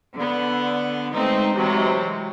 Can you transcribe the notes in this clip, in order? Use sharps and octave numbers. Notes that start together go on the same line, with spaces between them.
D3 B3
G#3 A3 C4 D#4
C3 E3 F#3 G#3